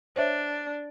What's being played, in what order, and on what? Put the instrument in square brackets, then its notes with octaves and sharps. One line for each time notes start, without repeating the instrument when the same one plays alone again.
[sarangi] D4 [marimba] C5 C#5 E5